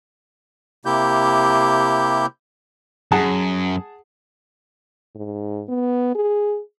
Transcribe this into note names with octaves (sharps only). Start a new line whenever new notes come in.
C3 A#3 E4 G4 G6
F#2 G#4 F#5 A5
G#2
B3
G#4